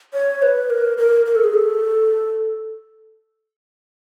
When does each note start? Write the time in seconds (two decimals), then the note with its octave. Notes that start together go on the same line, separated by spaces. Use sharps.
0.14 C#5
0.42 B4
0.70 A#4
0.98 A#4
1.26 A#4
1.35 A4
1.44 G#4
1.54 A4